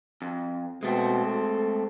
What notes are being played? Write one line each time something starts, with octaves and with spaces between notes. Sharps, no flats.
F2
B2 G#3 A3 C4
A4